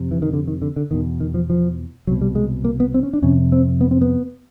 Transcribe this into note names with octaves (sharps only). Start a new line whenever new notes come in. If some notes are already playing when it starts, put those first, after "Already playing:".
Already playing: F2 C3
E3
D#3
D3
D#3
D3
D3
E2 B2 D#3
D#3
F3
F3
C2 B2 F#3
G3
G#3
A#3
B3
C4
C#4
D4
F2 C3 C#4
C4
B3
C4
B3